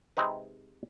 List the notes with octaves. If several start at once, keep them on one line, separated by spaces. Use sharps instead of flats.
C3 G#3 C4 D#4 B4